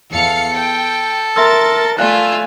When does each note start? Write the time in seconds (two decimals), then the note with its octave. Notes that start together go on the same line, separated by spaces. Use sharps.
0.12 E2 A4 F5 C#7
0.53 G5
1.36 A#4 E5 C6 E6 A6
1.99 A3 F4 D5 E5 F5 G#5 F#6